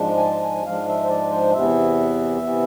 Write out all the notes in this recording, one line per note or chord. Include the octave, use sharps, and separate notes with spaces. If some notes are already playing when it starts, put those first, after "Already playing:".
Already playing: G#2 F3 G#3 D4
G#5
A5
G#5
G#2 F3 G#3 D4 F5
E5
C5
D5
C5
E2 C3 E3 B3 E5
C3 E3 B3